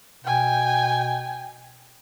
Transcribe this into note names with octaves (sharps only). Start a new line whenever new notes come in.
B2 G5 G#5